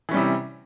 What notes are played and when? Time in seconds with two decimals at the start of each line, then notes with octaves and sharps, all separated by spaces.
0.09 E3
0.11 C#4
0.14 G3
0.17 C3